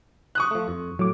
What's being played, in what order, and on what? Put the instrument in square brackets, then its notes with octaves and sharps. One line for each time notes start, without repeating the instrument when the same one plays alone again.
[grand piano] C#6 D#6 F#6
[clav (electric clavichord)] F3 A3
F2
[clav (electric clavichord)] A2 [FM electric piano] F#3 D6